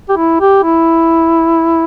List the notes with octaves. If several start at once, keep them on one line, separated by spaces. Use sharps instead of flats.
G4
E4
G4
E4